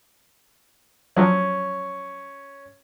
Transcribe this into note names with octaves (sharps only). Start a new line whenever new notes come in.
F3 F#3 C#4